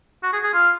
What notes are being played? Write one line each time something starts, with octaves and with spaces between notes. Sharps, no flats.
F#4
G#4
G#4
F4